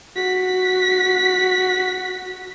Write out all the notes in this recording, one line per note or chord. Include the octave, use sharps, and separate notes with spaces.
F#4 B6